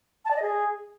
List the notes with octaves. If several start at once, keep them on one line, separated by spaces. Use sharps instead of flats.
A5
D5
D#5
G#4